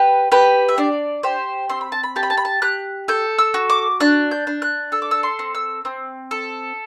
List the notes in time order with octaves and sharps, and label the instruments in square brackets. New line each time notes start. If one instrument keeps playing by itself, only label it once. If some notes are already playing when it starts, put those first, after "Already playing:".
Already playing: [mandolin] G4 B4
G4 B4
E5
D4 D5
G4 C5
C4 C6
B5
A5
B5
G4 A5
B5
A5
B5
A5
G4 F#6
A4 G6
E6
F#4
D6
D4 F#6
G6
D4
F#6
A4 E6
D6
E6
C6
C4
E6
C4
A4